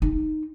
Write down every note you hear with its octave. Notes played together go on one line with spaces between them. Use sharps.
D#4